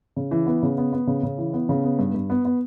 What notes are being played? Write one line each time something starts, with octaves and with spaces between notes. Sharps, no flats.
C#3
E3
B3
C#3
B3
B3
C#3
C#3
E3
B3
C#3
B3
G2
G2
B3
B3